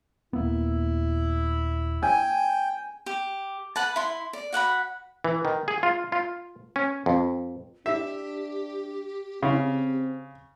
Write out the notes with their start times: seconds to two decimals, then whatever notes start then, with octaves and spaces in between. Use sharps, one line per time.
0.33 D#1 A#3 B3 E4
2.03 G5 G#5
3.06 G4
3.76 B4 F#5 A5
3.96 E4 C6
4.33 D5
4.53 F#4 F#5 G5 B5
5.24 E3
5.45 D#3
5.68 G#4
5.83 F4
6.12 F4
6.76 C#4
7.06 F2
7.86 D4 G4 E5
9.43 C#3 C4